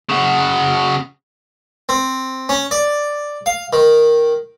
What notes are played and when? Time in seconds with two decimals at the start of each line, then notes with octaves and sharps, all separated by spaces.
0.09 C#3 F#4
1.89 C4
2.49 C#4
2.71 D5
3.46 F5
3.73 D#3